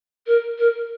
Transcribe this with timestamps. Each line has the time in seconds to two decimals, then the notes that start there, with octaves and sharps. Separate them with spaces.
0.27 A#4
0.58 A#4